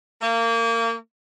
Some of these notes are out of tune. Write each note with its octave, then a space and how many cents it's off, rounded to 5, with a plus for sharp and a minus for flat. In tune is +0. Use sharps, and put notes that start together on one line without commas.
A#3 -25